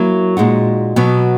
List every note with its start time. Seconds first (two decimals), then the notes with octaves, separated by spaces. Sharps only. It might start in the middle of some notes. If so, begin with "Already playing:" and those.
Already playing: F#3 A#3 E4
0.37 A#2 G#3 D#4 F#4
0.96 B2 F#3 B3